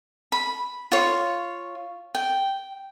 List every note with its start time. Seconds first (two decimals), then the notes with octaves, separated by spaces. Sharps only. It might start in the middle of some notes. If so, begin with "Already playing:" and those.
0.32 B5
0.92 F4 C#5
2.15 G5